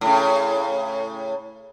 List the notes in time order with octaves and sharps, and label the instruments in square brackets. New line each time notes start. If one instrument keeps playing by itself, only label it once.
[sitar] A2 C#3